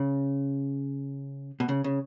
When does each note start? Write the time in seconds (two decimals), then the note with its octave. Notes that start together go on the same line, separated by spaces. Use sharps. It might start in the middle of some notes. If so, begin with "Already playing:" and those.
Already playing: C#3
1.60 B2
1.69 C#3
1.84 C#3